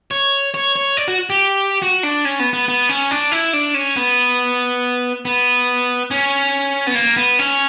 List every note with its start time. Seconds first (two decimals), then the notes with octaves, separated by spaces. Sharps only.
0.11 C#5
0.54 C#5
0.76 C#5
0.97 D5
1.08 F#4
1.30 G4
1.82 F#4
2.03 D4
2.25 C#4
2.39 B3
2.53 B3
2.68 B3
2.89 C#4
3.11 D4
3.32 E4
3.53 D4
3.74 C#4
3.96 B3
5.25 B3
6.11 C#4
6.87 B3
6.95 A#3
7.17 B3
7.39 C#4